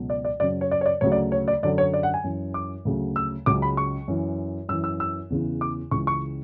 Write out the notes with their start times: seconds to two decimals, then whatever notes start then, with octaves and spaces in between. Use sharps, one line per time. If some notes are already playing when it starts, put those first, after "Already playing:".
Already playing: C#2 B2 F#3
0.10 D5
0.25 D5
0.40 F#2 C#3 F#3 D5
0.61 C#5
0.71 D5
0.81 C#5
0.86 D5
1.01 D2 C#3 F#3 C#5
1.12 D5
1.32 C#5
1.48 D5
1.63 F#2 D3 F#3 D5
1.78 C#5
1.94 D5
2.03 F#5
2.14 G#5
2.24 F#2 E3
2.54 D6
2.85 D2 C#3 F#3
3.16 E6
3.46 C#2 C#3 F#3 D6
3.62 B5
3.77 C#6
4.08 F#2 E3
4.69 F#2 E6
4.72 E3
4.84 E6
5.00 E6
5.30 E2 C#3 E3
5.61 D6
5.91 C#2 C#3 E3 C#6
6.07 C#6